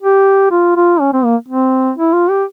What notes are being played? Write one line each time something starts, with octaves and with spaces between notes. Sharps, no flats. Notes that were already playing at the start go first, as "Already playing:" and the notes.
G4
F4
F4
C#4
C4
A#3
C4
E4
F4
G4